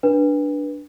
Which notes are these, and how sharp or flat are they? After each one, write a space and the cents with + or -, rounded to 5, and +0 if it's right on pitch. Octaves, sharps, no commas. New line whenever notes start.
D4 +0 B4 -15